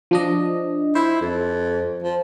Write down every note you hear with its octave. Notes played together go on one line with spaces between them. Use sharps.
F3 D4 D#5
E4 C5
F2
F3